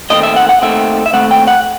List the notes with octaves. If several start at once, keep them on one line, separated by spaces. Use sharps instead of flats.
D#2 D#3 A3 C4 D#5
E5
F#5
F#5
D#2 D#3 A3 C4 E5
E5
D#2 D#3 A3 C4 F#5
G5
F#5